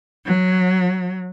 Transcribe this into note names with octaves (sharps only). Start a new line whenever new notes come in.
F#3